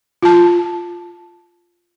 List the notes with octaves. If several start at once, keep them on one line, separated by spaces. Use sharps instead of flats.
F4 A5